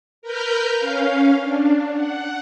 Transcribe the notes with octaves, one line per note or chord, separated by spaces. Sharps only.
A#4 B4 F6 G6
C#4 F5
D4
F#5